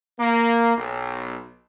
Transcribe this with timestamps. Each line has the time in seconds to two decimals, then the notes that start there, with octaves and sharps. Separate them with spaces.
0.19 A#3
0.77 B1